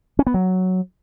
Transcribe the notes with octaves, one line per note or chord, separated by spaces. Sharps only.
C#4
B3
F#3